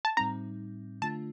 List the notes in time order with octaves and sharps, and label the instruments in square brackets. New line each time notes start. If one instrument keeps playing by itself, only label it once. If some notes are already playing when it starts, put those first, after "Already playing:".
[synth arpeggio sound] A5
[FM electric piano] A2 G3 C4 D#4 [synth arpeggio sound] A#5
[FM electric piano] D3 A3 D4 F4 [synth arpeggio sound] A5